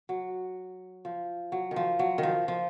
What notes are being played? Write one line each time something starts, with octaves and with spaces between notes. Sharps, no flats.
F#3
F3
F#3
D#3
F3
F#3
D#3
F3
F3